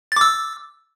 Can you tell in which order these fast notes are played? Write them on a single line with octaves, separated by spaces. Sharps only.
A6 D6 E6